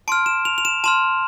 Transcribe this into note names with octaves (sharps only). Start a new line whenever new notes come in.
A5 C6 F6 D7
E7
F7
F7
E7
A5 C6 F6 E7